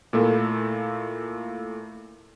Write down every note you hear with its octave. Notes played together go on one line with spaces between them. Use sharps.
A#2 A3 A#3 E4 A4